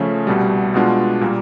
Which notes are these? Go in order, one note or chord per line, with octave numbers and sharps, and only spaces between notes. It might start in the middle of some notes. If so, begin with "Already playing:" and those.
Already playing: C#3 F3 A3 C#4
C2 B2 G3
B2 G#3 B3 D4 F4
A#2 G3 A#3